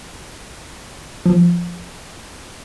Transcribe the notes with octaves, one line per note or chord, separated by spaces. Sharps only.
F3